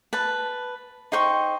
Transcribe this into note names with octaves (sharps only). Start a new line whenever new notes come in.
B4 A5
D#4 C5 G5 C#6